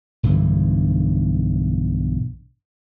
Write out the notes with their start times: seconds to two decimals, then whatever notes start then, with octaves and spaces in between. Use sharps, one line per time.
0.23 B1 G2 D3 E3